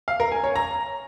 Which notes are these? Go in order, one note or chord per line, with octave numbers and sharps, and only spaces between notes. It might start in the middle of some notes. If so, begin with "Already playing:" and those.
F5
A#4
G#5
C#5
A#5